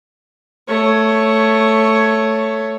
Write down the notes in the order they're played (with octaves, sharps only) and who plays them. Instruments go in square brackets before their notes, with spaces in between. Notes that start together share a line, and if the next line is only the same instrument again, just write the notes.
[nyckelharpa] A3 C#5